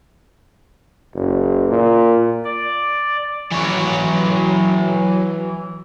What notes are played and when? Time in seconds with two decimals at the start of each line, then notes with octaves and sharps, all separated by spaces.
1.14 F#1
1.69 A#2
2.44 D5
3.51 E3 F#3 C#5